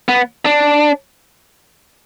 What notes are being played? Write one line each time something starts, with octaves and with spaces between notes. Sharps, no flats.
B3
D4